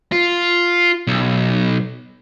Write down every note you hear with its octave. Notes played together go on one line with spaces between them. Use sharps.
F4
B1